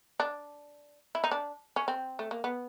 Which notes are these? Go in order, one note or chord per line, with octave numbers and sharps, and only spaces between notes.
D4
E4
D#4
D4
C#4
C4
A3
A#3
B3